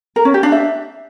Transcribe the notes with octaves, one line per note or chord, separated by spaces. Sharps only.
A#4
C#4
G4
D4
E5